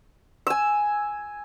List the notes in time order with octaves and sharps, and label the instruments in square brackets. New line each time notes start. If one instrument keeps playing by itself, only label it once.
[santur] G#5 E6